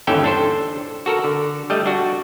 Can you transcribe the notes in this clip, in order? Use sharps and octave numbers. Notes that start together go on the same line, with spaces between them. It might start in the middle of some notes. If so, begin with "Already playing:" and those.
G1 D#2 E3 C#4 A4 G5
D4 A4 C5
F#4 A4 A#4
D3
G3 A3 D#5
D4 F#4